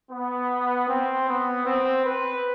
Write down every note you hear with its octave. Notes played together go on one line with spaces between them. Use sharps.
B3
C4
B3
C4
B4